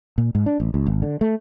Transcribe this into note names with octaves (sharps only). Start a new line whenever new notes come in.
A#2
G#2
D4
A1
C#2
G#1
D3
A3